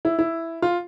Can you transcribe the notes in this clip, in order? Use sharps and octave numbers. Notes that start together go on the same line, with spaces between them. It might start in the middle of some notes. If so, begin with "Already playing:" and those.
E4
E4
F4